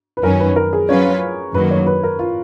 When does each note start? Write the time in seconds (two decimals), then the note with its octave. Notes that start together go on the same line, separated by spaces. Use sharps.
0.17 B4
0.23 F#2 D#3 F#3 C#4 A#4
0.40 B4
0.56 A#4
0.73 G#4
0.89 F#3 C#4 F4 B4 C#5
1.54 F#2 D#3 F#3 A#3 B4
1.71 C#5
1.86 B4
2.03 A#4
2.19 F4